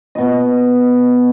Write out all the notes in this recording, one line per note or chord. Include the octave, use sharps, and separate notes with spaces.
B2 D#5